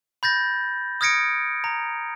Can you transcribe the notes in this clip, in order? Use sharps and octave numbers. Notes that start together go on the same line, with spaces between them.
B5 G6 A6 A#6
D#6 F6 G#6 A#6 C#7 D7
A#5